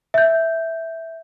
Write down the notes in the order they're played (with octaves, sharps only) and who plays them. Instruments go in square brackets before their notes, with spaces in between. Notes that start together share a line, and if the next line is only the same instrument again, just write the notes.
[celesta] E5 G6